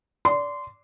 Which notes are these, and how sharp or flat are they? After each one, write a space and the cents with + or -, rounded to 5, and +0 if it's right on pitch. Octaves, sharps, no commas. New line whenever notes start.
D5 -20 C6 -20